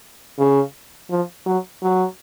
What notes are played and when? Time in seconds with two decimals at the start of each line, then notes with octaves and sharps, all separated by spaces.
0.39 C#3
1.10 F3
1.46 F#3
1.82 F#3